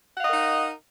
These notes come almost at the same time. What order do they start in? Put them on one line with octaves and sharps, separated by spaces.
F#5 F5 D#5 A#4 D#4